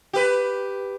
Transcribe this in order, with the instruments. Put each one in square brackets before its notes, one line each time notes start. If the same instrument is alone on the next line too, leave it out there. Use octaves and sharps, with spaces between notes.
[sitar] G4 B4